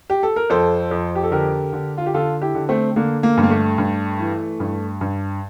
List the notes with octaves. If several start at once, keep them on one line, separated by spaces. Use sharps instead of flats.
G4
A4
A#4
F2 A4 C5
F2
G4
A4
D3 G4 A#4
D3
F4
G4
D3 F4 A4
E4 G4
D3
A3 C4
D3 A#3
A#3
G2
A#3
A3
G2
E3
G2
G2